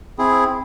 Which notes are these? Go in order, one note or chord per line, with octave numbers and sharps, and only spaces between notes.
C4 E4 G#4